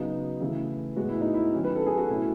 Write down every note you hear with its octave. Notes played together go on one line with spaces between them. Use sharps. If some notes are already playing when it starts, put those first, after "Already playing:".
Already playing: C#3 F#3 B3 D#4
C#3 E3 A3
A2 G#3 B3 F#4
E4
D#4
E4
D#3 F#3 C#4
B4
A4
G#4
F#4
B2 A3 C#4 E4